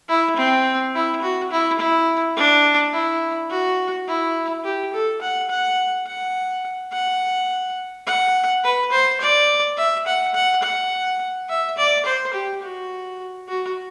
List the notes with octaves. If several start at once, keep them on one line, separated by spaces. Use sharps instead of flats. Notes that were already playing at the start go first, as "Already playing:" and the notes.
E4
C4
E4
F#4
E4
E4
D4
E4
F#4
E4
G4
A4
F#5
F#5
F#5
F#5
F#5
B4
C5
D5
E5
F#5
F#5
F#5
E5
D5
C5
G4
F#4
F#4